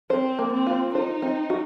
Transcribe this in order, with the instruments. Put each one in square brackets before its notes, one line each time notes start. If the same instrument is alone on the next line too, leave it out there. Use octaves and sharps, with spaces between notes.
[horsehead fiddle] C4 [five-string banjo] C5
[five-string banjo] A#3
[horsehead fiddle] C4
[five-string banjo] F4
[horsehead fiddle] D#4 [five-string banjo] C5
[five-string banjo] C4
F#4